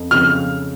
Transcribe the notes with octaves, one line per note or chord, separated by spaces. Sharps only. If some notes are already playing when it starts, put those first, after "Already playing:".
Already playing: F2
C#3 F3 C4 D#4 F6